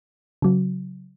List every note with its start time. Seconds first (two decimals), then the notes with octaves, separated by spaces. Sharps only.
0.42 C#3 F#3